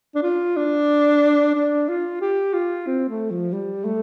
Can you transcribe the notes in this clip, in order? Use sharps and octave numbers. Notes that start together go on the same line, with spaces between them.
D4
F4
D4
D4
F4
G4
F4
C4
A3
F3
G3
A3